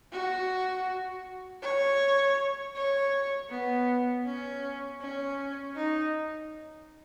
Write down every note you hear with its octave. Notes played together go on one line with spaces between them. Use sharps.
F#4
C#5
C#5
B3
C#4
C#4
D#4